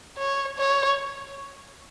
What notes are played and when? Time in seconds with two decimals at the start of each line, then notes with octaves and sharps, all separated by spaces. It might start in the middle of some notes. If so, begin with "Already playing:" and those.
0.17 C#5
0.57 C#5